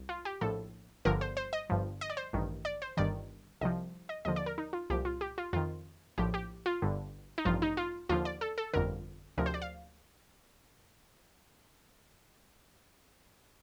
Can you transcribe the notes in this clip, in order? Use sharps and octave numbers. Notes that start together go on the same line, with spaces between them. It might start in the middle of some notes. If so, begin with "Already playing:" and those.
Already playing: C2
F4
G4
A#1 A2 F3 A4
G1 G2 D3 F3 A#4
C5
C5
D#5
G1 G2 F3
D#5
D5
C5
A1 G2 D#3
D5
C5
G1 G2 D#3 D5
C2 C3 F3 D#5
D#5
D#2 D3 F3 D#5
D5
A#4
D#4
F4
C2 A#2 F3 G4
F4
G4
F4
F2 D#3 F4
A#1 A2 F3 G4
G4
F4
G1 G2 D3
D#4
A1 G2 F3 F4
D#4
F4
D#2 D3 F3 F4
D5
A4
A4
G1 F2 D3 A#4
D2 C3 F3 A#4
C5
D5
F5